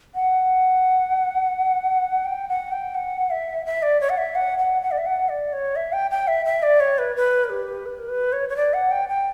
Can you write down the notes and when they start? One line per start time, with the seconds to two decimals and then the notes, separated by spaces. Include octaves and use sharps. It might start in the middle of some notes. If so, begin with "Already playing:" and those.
0.15 F#5
2.25 G5
2.49 F#5
2.72 G5
2.95 F#5
3.30 E5
3.66 E5
3.82 D5
4.01 C#5
4.09 F#5
4.18 E5
4.35 F#5
4.58 F#5
4.82 F#5
4.91 D5
4.98 E5
5.06 F#5
5.29 D5
5.53 C#5
5.76 E5
5.92 G5
6.11 G5
6.27 E5
6.45 E5
6.63 D5
6.80 C#5
6.98 B4
7.16 B4
7.44 A#4
7.50 G4
7.86 B4
7.98 A#4
8.08 B4
8.33 C#5
8.49 C#5
8.56 D5
8.73 F#5
8.91 G5
9.09 G5